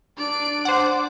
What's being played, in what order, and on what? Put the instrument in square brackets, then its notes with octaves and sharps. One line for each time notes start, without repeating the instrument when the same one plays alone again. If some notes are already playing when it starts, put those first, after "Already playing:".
[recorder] D4 [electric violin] D5 D7
[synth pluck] C5 F#5 [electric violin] D5 D6